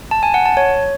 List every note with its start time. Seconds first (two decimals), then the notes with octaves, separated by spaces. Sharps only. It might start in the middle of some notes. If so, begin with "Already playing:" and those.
0.11 A5
0.23 G#5
0.34 F#5
0.46 A5
0.57 C#5